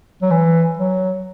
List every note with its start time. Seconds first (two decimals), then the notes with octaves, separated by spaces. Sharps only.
0.22 F#3
0.31 E3
0.78 F#3